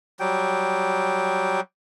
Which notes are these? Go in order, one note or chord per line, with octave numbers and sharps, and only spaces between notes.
F#3 G3 G5